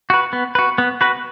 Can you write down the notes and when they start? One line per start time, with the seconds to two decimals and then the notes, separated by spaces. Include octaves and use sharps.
0.10 F#4 B4
0.33 B3
0.55 F#4 B4
0.78 B3
1.01 F#4 B4